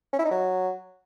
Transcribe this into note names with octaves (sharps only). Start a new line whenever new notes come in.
C#4
E4
D#4
F#3